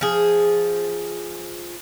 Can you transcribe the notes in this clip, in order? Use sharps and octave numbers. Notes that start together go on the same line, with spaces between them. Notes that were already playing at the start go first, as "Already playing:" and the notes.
F3 G#4